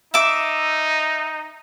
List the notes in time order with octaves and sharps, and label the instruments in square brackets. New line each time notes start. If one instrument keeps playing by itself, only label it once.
[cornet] D#4 [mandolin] E5 D6